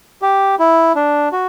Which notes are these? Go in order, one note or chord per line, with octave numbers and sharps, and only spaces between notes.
G4
E4
D4
F#4